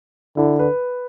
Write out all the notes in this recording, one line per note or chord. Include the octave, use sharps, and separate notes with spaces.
D3 E4
B4